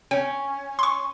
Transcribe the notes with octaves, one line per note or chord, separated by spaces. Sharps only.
C#4 G5
C6 C#6